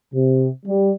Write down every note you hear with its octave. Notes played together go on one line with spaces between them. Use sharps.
C3
G3